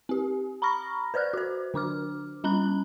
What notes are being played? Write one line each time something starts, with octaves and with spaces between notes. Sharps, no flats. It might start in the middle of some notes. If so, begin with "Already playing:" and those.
C4 G4
A#5 B5 C#6 F6 A#6
B4 C5 D5 F6 F#6
F#4 C5
D3 D4 D6 F6
G3 C#4 A#5 B5 F#6